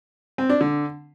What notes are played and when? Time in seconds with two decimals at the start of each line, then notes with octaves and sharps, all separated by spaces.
0.38 C4
0.50 D4
0.61 D3